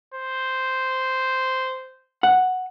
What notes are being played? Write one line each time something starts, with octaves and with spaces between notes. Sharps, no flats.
C5
F#5